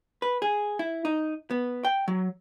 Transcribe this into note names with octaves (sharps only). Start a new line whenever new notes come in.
B4
G#4
E4
D#4
B3
G5
F#3